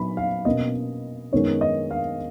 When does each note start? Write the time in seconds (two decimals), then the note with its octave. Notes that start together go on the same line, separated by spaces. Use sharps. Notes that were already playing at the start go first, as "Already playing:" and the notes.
Already playing: A#2 F#3 B3 D#4 B5
0.17 F5
0.45 B2 A#3 C#4 D#5
1.32 F#2 D#3 G#3 B3 D#4 C#5
1.61 D#5
1.91 F5